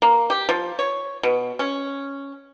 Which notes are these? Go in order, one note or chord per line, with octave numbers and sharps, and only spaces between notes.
A#3
G4
F3
C#5
B2
C#4